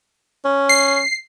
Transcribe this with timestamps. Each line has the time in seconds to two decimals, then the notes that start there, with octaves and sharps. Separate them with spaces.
0.45 C#4
0.69 C7